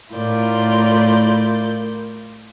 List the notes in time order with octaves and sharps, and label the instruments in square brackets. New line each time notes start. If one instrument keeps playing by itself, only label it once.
[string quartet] A2 E4 F4 A#4 D5 G6